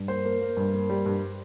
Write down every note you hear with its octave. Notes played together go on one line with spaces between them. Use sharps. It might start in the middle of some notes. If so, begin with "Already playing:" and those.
Already playing: G2
A#3 C5
A#3
A#3
G2
A#3
G3
G2